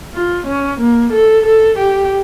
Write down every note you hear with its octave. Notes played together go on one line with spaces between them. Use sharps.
F4
C#4
A#3
A4
A4
G4